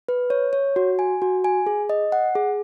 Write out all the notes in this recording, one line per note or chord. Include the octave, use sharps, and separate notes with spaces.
B4
C#5
C#5
F#4
G#5
F#4
G#5
G#4
D#5
F#5
G#4